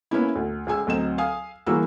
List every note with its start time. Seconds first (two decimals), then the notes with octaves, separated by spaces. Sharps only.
0.11 A#3 B3 C#4 E4
0.35 D2
0.67 C#2 G#4 G#5 E6
0.87 D2 F#3 C4 D#5 E7
1.18 F5 G#5 D#6
1.67 G1 E3 A#3 F#4 G#4 E6